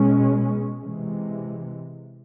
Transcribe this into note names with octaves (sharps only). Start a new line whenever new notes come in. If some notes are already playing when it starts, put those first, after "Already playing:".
Already playing: B2 G#3 C#4
C3 E3 G#3